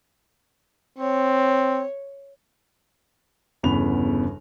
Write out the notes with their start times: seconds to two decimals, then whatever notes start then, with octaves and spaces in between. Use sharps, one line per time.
0.98 C4 C#5
3.63 G1 E2 C#3 B3 B5 F7